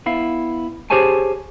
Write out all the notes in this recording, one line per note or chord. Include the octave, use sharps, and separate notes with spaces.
B3 E4 F5
G4 G#4 C5 C#5 G#5 A5